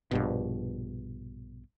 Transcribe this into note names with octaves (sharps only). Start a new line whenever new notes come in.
A#1 G2 B2